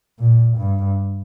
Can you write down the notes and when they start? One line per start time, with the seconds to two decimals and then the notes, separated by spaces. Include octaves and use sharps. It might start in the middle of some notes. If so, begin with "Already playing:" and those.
0.19 A#2
0.57 G2